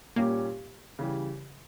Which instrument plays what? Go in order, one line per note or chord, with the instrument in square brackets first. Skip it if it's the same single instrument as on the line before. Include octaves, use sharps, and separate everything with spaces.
[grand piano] A#2 G3 C#4 G4 [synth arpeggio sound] A#3
[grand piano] C#3 E3 G3